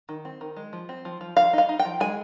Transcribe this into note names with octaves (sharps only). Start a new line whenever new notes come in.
D#3
C4
D#3
G#3
F3
C4
F3
F3
F3 F5
D#4 F5
D#4
G5
F3
G#3 G#5